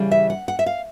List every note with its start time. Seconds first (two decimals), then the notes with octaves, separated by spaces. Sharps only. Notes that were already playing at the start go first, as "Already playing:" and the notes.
Already playing: C#3 E3 G3
0.11 E5
0.30 F#5
0.48 F#5
0.59 E5
0.66 F5